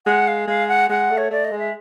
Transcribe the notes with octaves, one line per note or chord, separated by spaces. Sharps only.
G#3 F#5
F5
G#3 F5
F#5
G#3 F#5
A3
C#5
A3 D5
D#5
G#3
E5